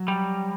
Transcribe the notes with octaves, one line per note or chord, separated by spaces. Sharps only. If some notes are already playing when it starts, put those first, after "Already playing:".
Already playing: F#3
G3